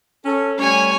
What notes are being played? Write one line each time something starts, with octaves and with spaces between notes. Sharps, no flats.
C#4 A4
G3 A3 C#4 C#5 G#5